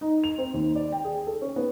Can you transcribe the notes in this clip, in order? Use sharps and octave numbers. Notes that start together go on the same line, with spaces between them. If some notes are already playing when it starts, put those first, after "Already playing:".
D#4
F7
C4
D#2
D5
G5
G#4
A4
C#4
B3